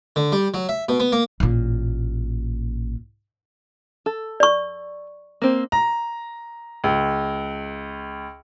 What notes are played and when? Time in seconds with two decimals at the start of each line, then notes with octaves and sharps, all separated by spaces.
0.16 D3
0.32 G3
0.54 F#3
0.69 E5
0.89 B2
1.00 B3
1.12 A#3
1.40 A1 A#2
4.06 A4
4.40 D5 C#6
5.42 A#3 C4
5.72 A#5
6.84 C#2